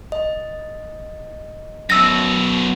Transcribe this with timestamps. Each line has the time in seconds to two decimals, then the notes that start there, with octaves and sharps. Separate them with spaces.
0.12 D#5
1.90 F#2 B2 E6 A#6